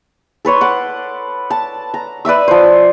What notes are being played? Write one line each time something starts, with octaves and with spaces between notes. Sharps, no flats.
A4 B4 C#5 C6
F#5 D6
A5
A#5
B4 D5 E5 E6
F3 C5